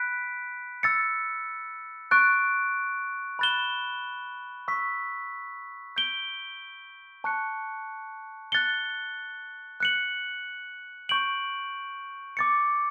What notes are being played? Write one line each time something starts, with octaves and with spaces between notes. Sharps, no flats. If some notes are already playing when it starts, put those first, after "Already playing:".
Already playing: B5 F#6 B6 D7
E6 A6 C#7
C#6 F#6 A6 D7
B5 F#6 A6 E7 G7
C#6 E6 B6
G6 D7 G7
A5 C#6 F#6 C#7
F#6 A6 C#7 G7
F#6 C#7 F#7
C#6 G6 D7 F#7
D6 A6 C#7